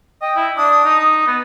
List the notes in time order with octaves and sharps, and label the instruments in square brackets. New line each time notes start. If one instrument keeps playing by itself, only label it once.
[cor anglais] D#5 [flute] G5
[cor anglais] E4
[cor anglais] D4 [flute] D#6
[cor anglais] D#4
B3